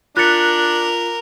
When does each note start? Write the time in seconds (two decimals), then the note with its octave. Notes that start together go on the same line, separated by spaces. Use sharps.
0.17 D4 F4 A#4 F#6 A6 B6 C#7